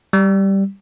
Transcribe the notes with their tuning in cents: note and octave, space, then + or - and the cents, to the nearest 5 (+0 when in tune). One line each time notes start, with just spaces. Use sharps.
G3 -5